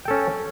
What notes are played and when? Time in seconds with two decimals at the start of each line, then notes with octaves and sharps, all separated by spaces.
0.05 G5
0.08 A4
0.11 C#4